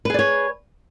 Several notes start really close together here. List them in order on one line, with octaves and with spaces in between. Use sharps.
B4 G#4 D5 C#5